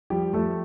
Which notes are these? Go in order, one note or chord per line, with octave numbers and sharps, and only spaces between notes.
F3 G3 G4
F3 A3 A4